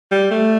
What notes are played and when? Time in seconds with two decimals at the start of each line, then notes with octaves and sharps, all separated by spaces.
0.11 G3
0.31 A3